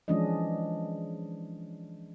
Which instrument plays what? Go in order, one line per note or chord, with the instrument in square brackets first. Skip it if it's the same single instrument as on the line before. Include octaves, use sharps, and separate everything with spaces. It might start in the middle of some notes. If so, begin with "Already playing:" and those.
[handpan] E3 F3 G#3 C#4 D4 D#5